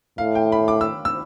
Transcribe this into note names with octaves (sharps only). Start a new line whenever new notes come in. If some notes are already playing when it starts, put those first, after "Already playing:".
A2 F5
G5
B5
D6
E6
E6